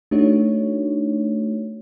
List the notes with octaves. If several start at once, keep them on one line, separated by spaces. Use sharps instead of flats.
A3 D4 D#4 F#4 C#5